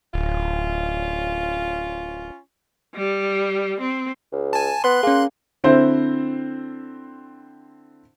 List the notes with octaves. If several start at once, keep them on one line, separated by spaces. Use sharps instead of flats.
D1 C#4 F4
G3
C4
C#2
G#5 A5
B3 C6 F#6
A#3 C#4 G#4
D3 C4 E4 C5